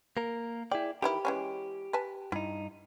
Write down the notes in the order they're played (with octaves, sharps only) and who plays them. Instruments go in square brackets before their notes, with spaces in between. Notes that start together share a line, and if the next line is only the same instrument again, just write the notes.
[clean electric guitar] A#3 A#4
[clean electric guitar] E4 G#4 D5 [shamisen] G5
[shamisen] D#3 E3 E4 [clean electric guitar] G4
[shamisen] E3 G#3 C#4
B4 G#5 A5
[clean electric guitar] G2 D#4 [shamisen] E4